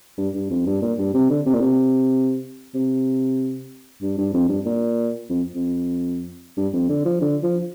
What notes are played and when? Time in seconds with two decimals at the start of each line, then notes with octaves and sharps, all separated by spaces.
0.18 G2
0.34 G2
0.50 F2
0.66 G2
0.82 A#2
0.98 G2
1.14 C3
1.30 D3
1.46 C3
1.53 A#2
1.60 C3
2.74 C3
4.02 G2
4.18 G2
4.33 F2
4.49 G2
4.66 A#2
5.29 F2
5.55 F2
6.57 G2
6.73 F2
6.89 D3
7.05 F3
7.21 D3
7.43 F3